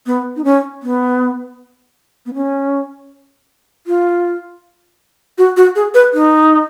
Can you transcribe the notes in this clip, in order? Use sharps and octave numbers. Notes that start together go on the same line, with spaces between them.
B3
D#4
C#4
B3
B3
C#4
F4
F#4
F#4
G#4
B4
D#4